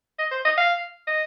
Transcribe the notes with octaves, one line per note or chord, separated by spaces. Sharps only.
D#5
C5
D#5
F5
D#5